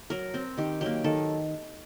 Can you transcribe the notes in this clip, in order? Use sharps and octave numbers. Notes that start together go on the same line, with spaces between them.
F#3 A#4
C4
D#3 G4
F#3 A#3 G4
D#3 A4